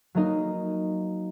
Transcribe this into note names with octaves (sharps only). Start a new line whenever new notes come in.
F#3 A#3 D#4 A#4 D#5